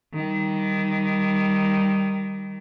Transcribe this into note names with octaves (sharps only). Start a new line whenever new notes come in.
D#3 G3